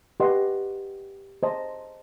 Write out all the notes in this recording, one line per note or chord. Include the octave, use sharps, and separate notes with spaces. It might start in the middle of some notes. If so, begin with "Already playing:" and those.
G4 B4 D#5 F#5 C6
C5 D#5 A5